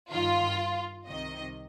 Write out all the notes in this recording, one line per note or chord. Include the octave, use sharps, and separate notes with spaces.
G2 D#3 F4
C2 C3 D#3 D#5